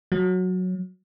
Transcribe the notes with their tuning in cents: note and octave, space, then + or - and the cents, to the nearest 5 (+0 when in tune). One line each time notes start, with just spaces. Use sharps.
F#3 -10